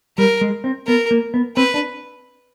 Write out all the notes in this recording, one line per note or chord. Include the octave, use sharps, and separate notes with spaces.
G3 A#4
G#3
C4
B3 A#4
A#3
B3
C4 B4
D4